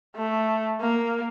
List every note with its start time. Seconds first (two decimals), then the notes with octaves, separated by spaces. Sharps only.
0.16 A3
0.81 A#3